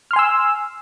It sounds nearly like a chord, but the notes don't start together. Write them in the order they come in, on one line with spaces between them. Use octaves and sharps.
F6 C6 G#5 E6